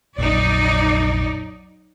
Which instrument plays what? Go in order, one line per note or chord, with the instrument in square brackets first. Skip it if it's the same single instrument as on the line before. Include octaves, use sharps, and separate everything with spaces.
[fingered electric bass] F1 A#1 [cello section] F#3 D#4 D5